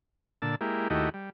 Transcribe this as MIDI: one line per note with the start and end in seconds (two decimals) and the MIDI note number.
0.42 0.55 46
0.42 0.55 50
0.42 0.55 81
0.42 0.55 88
0.61 0.88 56
0.61 0.88 58
0.61 0.88 64
0.61 0.88 67
0.90 1.09 39
0.90 1.09 57
0.90 1.09 64
0.90 1.09 66
0.90 1.09 67
0.90 1.09 75
1.14 1.30 55